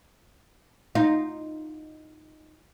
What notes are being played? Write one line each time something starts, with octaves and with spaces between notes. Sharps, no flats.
D#4 F4